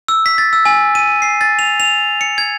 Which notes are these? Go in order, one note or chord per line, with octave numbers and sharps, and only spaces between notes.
E6
B6
A6
E6
G#5
D#7
C7
A6
F7
F7
C#7
G#6